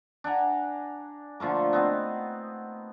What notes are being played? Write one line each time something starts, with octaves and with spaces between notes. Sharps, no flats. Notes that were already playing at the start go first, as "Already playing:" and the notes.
D4 F#5 G#5 A#5
D3 F3 A3 A#3
B3 C4 D#4